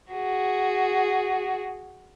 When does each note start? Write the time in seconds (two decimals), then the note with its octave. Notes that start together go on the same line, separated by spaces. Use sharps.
0.13 F#4 G#4